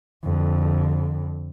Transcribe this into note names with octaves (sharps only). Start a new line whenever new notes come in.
F2 D3